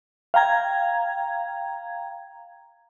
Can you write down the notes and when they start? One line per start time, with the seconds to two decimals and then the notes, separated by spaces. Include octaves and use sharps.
0.34 F5 G5 A#5 G#6